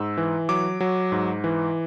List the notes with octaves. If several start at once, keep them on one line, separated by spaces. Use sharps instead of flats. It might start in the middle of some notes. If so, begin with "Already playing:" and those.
Already playing: G#2 E6
E3
F#3 D6
F#3
G#2
E3